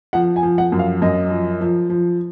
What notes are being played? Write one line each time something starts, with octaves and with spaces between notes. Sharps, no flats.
F3 F#5
G#5
F3
F#5
F#2
F5
F#2 D#5
F3
F3
F3